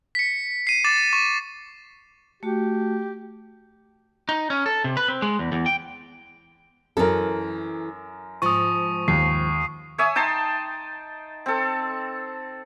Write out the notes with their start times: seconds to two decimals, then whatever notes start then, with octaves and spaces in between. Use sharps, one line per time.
0.15 B6 C#7
0.67 C7 D#7
0.84 D6 A6 E7
1.13 C#6
2.43 A3 F#4 G4
4.29 D#4
4.50 C#4
4.66 A4
4.84 C3
4.97 B4
5.08 C4
5.22 G#3
5.39 E2
5.52 E2
5.66 G5
6.97 F#2 E3 A4 A#4
8.42 G#2 F3 C#6 D#6
9.08 D#2 C7
9.98 C#5 E5 G#5 D#6
10.16 D#4 G5 A5 C6
11.46 C4 A4